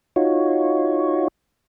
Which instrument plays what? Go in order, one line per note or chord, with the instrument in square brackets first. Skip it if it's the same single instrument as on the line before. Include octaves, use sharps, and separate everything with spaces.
[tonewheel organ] D#4 F4 F#4 C#5